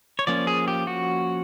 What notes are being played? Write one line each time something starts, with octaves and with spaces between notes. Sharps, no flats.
C#5
F3 A#3 C#4 D5
G#4
G4
F#4